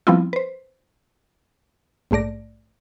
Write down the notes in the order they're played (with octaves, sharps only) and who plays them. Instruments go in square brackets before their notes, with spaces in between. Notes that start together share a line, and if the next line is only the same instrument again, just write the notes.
[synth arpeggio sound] F3 G3 B3 C4 E4 F4
B4 C5
A#1 G#2 A3 D5 A#6